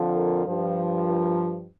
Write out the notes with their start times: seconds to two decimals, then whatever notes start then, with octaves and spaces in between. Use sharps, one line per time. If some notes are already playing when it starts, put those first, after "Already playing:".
Already playing: F2 D3 F3
0.16 A#4
0.45 G2 F3
1.05 A#4